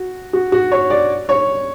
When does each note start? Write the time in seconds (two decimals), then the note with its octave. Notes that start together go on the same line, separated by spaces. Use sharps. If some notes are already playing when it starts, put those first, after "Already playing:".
Already playing: F#4
0.33 F#4
0.52 F#4
0.72 C#5
0.90 D5
1.29 C#5